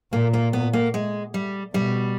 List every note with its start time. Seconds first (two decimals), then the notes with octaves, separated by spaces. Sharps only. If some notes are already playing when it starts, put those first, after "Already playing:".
0.13 A#2 A#3
0.33 A#3
0.53 B3
0.73 A#3
0.94 G#3
1.34 G3
1.74 B2 G3